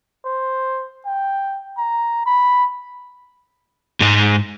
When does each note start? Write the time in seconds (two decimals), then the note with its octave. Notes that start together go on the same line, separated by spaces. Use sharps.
0.26 C5
1.06 G5
1.78 A#5
2.26 B5
4.01 G#2 G#3